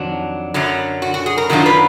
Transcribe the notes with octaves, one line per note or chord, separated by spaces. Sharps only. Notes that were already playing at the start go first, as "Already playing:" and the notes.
Already playing: F2 D#3 F#3 D4
F#2 D3 F#3
F#4
F#4
G#4
A#4
F#2 D#3 F#3 D4 F4 F#4
B4